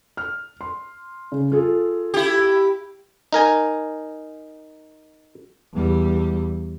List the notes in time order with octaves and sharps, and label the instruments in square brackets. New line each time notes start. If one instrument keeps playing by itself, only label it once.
[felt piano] F6
C6
C#3
F4 G#4 A4
[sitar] E4 G4
[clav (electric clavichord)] D#4 A#4 G#5
[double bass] E2 G3